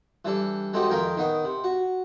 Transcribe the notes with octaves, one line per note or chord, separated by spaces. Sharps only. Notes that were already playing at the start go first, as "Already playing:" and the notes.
E3 G3 D4 A4
G#3 A3 C4 D#4 F#4 G4
F2 D#3 A#4 D#5 F5 G5
D#3 B3 D#4
C3
F#4